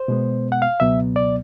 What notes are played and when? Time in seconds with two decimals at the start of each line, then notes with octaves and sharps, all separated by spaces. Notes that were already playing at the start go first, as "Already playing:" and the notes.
Already playing: C5
0.08 B2 G#3 B3
0.52 F#5
0.62 F5
0.80 C#2 B2 F#3 B3 E5
1.16 D5